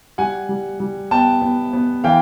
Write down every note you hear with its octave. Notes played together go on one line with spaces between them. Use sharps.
G3 F#5 G#5
G3
G3
B3 G5 A5
B3
B3
E3 F5 G5